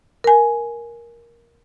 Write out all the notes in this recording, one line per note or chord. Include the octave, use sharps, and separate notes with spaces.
A#4 G#5